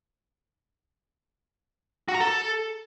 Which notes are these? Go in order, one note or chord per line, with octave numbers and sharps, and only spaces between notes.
F#4
A#5
A4